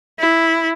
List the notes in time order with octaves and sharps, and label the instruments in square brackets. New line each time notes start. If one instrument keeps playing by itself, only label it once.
[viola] E4